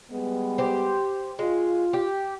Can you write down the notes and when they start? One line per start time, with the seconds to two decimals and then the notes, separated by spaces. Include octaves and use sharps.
0.11 G3 G#3 B3
0.58 G4 C5
1.39 G#3 F4
1.93 G4